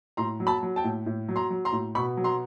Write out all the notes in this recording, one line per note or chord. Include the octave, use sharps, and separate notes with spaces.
A2 A#5 C6
F#3
A5 B5
F#3
G5 A5
A2
A2
F#3
A#5 C6
F#3
A#5 C6
A2
B2 B5 C#6
F#3
A#5 C6